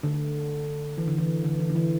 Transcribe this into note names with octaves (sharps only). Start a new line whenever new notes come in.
D3
E3
D3
E3
D3
E3
D3
E3